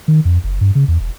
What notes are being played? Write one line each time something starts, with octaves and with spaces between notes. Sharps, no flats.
D#3
F2
F#1
G2
C#3
E2
E1